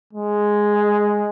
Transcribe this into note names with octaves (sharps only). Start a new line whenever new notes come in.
G#3